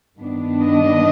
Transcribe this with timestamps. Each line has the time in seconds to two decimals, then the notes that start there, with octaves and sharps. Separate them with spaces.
0.17 G2 D#3 B3 D4
0.61 D#5